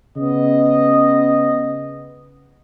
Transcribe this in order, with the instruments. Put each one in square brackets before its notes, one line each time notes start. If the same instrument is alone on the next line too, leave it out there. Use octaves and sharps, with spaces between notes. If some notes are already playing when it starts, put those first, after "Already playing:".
[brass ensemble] C#3 B3 D#5